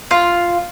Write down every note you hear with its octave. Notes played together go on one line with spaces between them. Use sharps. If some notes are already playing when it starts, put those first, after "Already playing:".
F4